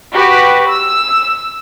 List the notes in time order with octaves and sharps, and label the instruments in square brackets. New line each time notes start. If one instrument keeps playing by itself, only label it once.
[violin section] F#4 G4 B4
E6